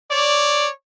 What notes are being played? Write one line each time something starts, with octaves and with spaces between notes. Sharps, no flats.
C#5 D5